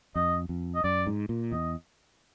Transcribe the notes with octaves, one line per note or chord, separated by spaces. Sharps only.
F2 D#5
F2
D#5
F#2 D5
G#2
A#2
E2 D#5